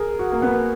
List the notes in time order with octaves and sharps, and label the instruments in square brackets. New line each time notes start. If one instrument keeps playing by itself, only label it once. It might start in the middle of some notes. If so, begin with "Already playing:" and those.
Already playing: [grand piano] G#4 A#4
F#4
A#3
B3